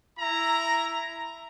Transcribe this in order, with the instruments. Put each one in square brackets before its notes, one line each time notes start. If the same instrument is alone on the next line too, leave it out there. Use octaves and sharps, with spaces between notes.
[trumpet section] E4 A#5